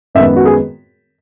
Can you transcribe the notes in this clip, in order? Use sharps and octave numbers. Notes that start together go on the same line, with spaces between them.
F#2 D#3 G#3 B3 E5
F#4
G#4